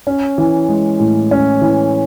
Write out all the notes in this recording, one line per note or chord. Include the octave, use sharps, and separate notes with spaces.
C#4
E3
G#3
A2
C#4
E3